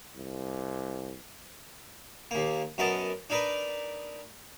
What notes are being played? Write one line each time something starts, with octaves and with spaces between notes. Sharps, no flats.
C2
D#2 A#3
F#2 B3 A#4 D#5 A5
D4 D#4 A#4 B4